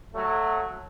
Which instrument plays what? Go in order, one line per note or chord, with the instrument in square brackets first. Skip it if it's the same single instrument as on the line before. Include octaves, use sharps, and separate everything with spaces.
[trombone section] F#3 A3